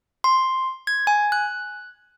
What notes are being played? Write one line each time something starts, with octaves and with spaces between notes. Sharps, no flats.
C6
G#6
G#5
F#6